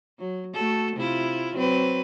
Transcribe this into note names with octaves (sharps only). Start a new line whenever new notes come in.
F#3
A3 F#4 A4
C3 E4 F4
F#3 C4 B4